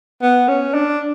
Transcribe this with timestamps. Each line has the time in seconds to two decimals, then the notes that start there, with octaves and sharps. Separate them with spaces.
0.23 B3
0.48 C#4
0.74 D4